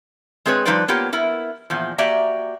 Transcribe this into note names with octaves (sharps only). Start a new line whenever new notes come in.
G#3 C4 G#4 B4 C#5
F3 G3 D#4 B4 C5 D5
A#3 B3 F4 G4 C#5
B3 E4 A#4
E2 A#2 F3
A#3 F#4 G4 D5 E5 A#5